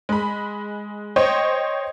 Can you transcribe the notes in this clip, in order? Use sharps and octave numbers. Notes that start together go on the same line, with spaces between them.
G#3 B5
C5 C#5 D#5 G5